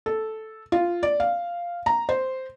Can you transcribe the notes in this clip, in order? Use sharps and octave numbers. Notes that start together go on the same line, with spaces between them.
A4
F4
D5
F5
A#5
C5